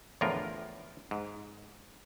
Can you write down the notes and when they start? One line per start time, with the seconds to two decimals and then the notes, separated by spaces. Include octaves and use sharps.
0.21 E2 A2 D3 F3 F4 A#4
1.11 G#2